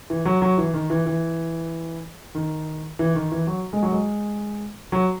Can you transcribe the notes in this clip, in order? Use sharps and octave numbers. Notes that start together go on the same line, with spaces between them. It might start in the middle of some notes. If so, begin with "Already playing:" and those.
E3
F#3
F#3
E3
D#3
E3
E3
D#3
E3
D#3
E3
F#3
G#3
F#3
G#3
F#3